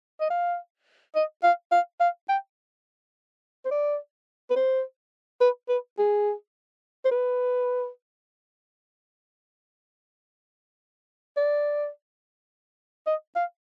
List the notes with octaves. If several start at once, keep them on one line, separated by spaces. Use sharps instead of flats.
D#5
F5
D#5
F5
F5
F5
G5
C5
D5
B4
C5
B4
B4
G#4
C5
B4
D5
D#5
F5